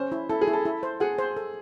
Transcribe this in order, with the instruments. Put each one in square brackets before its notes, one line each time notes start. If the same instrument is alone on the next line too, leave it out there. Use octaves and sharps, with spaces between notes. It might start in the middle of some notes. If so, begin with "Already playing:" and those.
Already playing: [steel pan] C#4 [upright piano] C5
[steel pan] E4
[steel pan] E4 [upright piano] A4
[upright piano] G#4
[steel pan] E4
[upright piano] A4
[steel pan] E4
C5
[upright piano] G#4 [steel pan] F#5
[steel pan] C5
A4